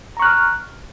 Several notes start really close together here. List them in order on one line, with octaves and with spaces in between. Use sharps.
A#5 C#6 F#6 F6